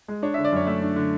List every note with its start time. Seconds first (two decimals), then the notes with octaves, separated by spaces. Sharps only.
0.08 G#3
0.23 D4 C#5
0.34 D3 E5
0.45 D5
0.52 F#2 C#5
0.67 A3 E5
0.82 D4
0.96 D3